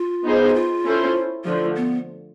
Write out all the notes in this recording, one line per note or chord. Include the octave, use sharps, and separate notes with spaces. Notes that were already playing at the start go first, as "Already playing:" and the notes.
Already playing: F4
B3 D#4 G#4 C5
F#4
F4
C#4 E4 A4 C5
D3 F3 A3 F4
B3